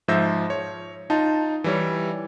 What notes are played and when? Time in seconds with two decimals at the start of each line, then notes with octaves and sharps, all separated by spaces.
0.08 G#2 F3 E5 E6 G6 A#6
0.50 C#5
1.10 D#4 F4 A5
1.64 E3 G3 C#5